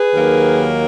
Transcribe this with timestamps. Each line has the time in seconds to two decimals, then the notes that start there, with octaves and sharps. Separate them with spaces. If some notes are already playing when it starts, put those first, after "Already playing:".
Already playing: G#4 B4
0.14 D#2 D#3 F#3 A#3